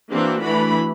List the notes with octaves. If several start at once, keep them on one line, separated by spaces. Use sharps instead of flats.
E3 A#3 C4 D4 F#4
E3 A3 D4 F#4 B5